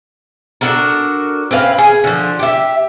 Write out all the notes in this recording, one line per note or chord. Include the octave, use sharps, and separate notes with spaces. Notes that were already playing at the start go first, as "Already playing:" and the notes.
D4 F#4 A4 A#4
C4 C#4 B4 F5
G#4
D3 F3
G4 E5